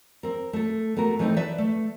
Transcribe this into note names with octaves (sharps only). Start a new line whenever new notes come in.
C4 A#4
A3 A4
A3 B3 F#4 A#4
E3 A3 C4 D#4 B4
B4 D5 E5
A3